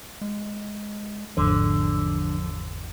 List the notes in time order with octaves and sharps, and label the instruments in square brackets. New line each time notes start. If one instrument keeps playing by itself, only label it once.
[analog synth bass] G#3
[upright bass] G#1 E2 [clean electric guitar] D3 [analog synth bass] F3